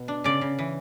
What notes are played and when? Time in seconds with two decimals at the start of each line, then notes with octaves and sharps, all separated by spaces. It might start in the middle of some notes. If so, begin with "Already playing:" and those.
Already playing: B2 B3
0.08 D4
0.24 C#3 D5
0.41 C#3
0.59 E3